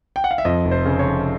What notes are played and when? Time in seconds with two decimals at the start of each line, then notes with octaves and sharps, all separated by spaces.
0.16 G5
0.24 F#5
0.31 F5
0.38 E5
0.45 F2 D#5
0.65 F1
0.71 C5
0.86 C#3
0.99 C#5
1.07 F1